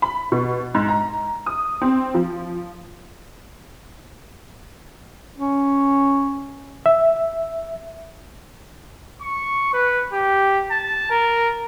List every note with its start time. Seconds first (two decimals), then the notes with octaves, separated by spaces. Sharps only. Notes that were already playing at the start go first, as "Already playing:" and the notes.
0.02 B5
0.32 B2
0.75 G#2
0.88 A#5
1.46 D#6
1.82 C4
2.14 F3
5.38 C#4
6.86 E5
9.21 C#6
9.73 B4
10.13 G4
10.71 A5
11.10 A#4